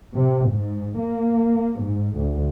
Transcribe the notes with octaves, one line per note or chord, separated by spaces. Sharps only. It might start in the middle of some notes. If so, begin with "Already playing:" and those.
C3
G#2
A#3
G#2
D2